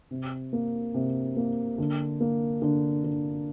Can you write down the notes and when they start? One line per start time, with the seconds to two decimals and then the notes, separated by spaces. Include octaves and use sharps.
0.11 C3
0.53 A#3
0.94 C3
1.37 A#3
1.78 D3
2.20 A#3
2.62 D3
3.04 D3